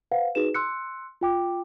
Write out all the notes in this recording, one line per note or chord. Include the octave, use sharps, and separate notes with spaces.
B4 C5 F5 F#5
D#4 F#4 G#4 B4 E7
C6 E6 F#6 C#7
F4 G5 D6